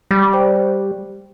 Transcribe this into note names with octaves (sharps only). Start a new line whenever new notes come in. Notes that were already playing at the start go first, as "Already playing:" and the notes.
G3 G4
C5 G5
G4